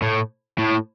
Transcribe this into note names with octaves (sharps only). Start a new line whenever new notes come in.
A2
A2